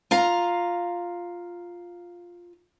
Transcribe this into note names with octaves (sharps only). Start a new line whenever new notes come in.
F4 F5 A#5